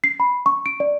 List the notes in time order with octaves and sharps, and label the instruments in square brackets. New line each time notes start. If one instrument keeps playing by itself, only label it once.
[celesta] C7
B5
C#6
D7
D5